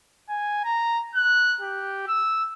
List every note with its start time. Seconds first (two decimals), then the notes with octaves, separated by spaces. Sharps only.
0.29 G#5
0.64 A#5
1.15 F#6
1.61 G4
2.07 E6